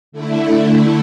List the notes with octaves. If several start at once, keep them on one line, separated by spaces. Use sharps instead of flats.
D3 A3 E4